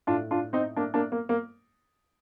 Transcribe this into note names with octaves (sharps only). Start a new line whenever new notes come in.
A2 D4 F4
D4 F4
C4 D#4
A#3 D4
A#3 D4
A#3
A#3